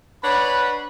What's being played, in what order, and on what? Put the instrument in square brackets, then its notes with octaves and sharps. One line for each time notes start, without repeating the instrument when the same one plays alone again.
[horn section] D4 B4 C#5 F#5 B5